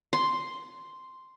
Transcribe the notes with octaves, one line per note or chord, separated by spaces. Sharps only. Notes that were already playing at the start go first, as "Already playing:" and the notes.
C6